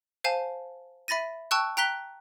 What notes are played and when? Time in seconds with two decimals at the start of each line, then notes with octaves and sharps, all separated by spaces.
0.24 C5 F5 G#5 A5
1.08 E5 B5 A6 A#6 D#7
1.51 G5 A5 C#6 E6 F#6
1.77 G5 A#5 F#6 B6 G7